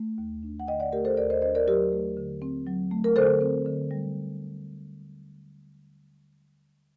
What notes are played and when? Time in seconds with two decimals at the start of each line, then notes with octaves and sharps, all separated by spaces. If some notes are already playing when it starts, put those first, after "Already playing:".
Already playing: A3
0.18 D#2
0.43 D4
0.60 F#5
0.67 D3 D#5 G5
0.80 D5 F#5
0.93 A3 G4 A#4
1.05 A4 C5
1.17 D#2 A#4 D5
1.30 C5 D#5
1.42 D4 C5 D#5
1.55 A#4 D5
1.67 F#3 G4 A#4
1.92 A3
2.17 D3
2.42 C4
2.67 F#3
2.91 A3
3.04 A#4
3.16 D3 A4 C5
3.41 C4
3.66 D3
3.91 G3